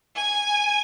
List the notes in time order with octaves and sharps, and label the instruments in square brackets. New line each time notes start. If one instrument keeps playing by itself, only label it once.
[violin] G#5